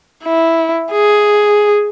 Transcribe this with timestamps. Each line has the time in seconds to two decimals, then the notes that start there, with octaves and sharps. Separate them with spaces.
0.24 E4
0.92 G#4